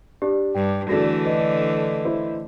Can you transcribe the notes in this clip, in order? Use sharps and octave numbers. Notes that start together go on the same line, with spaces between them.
D4 G4
G2 G5
D3 E3 A3 D4 F#4 G#4 A4 A#6
B4 D#5
E4 C5